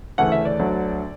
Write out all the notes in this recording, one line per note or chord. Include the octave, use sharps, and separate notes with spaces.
D2 C#3 E3 A3 C#4 F#5
E5
D5
D2 D3 F#3